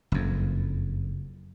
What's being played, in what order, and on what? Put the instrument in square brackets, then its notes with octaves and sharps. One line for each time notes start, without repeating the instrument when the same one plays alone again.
[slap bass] F#1 F2